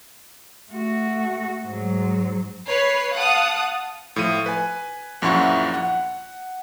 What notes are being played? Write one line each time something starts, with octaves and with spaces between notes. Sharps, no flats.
A3 F#4
G#2 F#3
B4 C#5 C7
F5 F#5 A5 D#6
A2 F3 D#7
B4 G#5
A#1 F#2 F3 E4 F#5 C#6
F#5